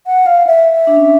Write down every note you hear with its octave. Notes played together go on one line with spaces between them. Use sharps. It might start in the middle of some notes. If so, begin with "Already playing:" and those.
F#5
F5
E5
D4
C#4